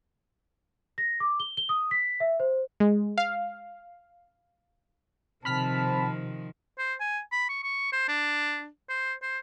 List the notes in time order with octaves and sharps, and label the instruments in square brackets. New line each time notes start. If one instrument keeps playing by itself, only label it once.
[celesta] A#6
D6
G7
G7
D#6
B6
E5
C5
[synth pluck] G#3
F5
[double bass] C3 [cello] D#3 F3 [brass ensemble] C4 A5 [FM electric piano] B5 F6 B6
[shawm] C5
G#5
B5
C#6
C#6
C5
D4
C5
C5